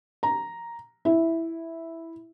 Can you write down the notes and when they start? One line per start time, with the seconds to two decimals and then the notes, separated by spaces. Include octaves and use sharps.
0.23 A#5
1.05 E4